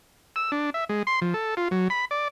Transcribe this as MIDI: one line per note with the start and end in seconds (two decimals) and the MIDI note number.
0.36 0.51 88
0.52 0.70 62
0.74 0.84 76
0.89 1.03 56
1.07 1.20 84
1.22 1.34 53
1.34 1.55 69
1.57 1.68 65
1.71 1.88 54
1.90 2.05 83
2.11 2.28 74